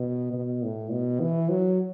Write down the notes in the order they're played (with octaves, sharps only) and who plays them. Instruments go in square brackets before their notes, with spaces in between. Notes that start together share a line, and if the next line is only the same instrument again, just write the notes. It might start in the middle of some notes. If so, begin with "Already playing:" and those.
Already playing: [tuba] B2
B2
A2
B2
E3
F#3